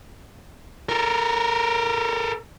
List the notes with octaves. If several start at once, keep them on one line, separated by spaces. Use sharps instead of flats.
A4 A#4